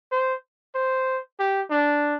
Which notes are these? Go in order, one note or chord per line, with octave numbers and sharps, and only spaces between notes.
C5
C5
G4
D4